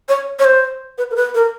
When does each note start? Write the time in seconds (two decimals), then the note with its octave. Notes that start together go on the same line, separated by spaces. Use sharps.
0.09 C#5
0.39 C#5
0.45 C5
0.98 B4
1.11 A#4
1.16 B4
1.35 A#4